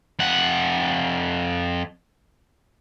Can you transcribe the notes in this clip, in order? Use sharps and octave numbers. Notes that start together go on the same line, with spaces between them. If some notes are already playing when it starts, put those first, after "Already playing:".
F2 F#5